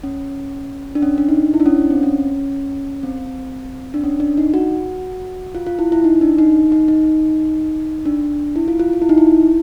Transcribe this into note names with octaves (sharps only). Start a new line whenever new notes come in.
C#4
D4
C#4
D4
D#4
E4
D4
C#4
D4
C4
C#4
C4
D4
C#4
D4
D#4
F#4
F4
F4
E4
E4
D#4
D4
D#4
D#4
D#4
D4
E4
F4
F4
F4
E4
D#4
E4